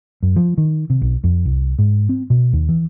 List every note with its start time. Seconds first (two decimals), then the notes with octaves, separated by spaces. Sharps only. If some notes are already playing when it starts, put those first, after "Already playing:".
0.23 F#2
0.36 F3
0.58 D#3
0.90 C3
1.02 B1
1.24 F2
1.45 C2
1.79 G#2
2.09 C4
2.30 B2
2.53 D#2
2.69 E3